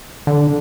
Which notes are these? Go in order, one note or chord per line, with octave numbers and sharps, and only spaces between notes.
D3